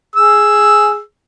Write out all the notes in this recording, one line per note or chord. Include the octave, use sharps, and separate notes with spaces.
G#4 E6